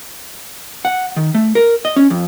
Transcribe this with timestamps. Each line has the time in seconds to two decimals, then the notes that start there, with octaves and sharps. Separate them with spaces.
0.85 F#5
1.16 D#3
1.34 A3
1.55 A#4
1.85 D#5
1.96 C#4
2.10 F2